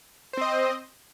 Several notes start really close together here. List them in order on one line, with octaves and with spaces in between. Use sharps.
C5 C4 D#5